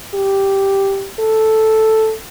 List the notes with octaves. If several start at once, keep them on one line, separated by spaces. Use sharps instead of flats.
G4
A4